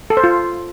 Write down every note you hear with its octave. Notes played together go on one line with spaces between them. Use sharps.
A4
C5
F4